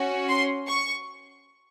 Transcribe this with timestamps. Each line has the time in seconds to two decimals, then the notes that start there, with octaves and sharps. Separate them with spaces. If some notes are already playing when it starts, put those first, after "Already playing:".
Already playing: C#4 F#4
0.28 C6
0.68 C#6